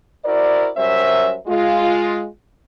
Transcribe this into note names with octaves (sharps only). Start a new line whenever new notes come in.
E4 F#4 A#4 C5 D5
F#3 G3 C#4 A#4 C5 E5
G#3 F4